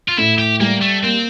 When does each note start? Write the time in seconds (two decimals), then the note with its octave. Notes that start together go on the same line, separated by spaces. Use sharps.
0.08 F4
0.18 A2 E4
0.39 G4
0.60 G3 A#3
0.81 A3
1.03 A#3 C4